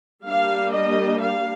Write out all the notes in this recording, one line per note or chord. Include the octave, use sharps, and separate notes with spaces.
G3 A#3 D4 F5
D#5
F5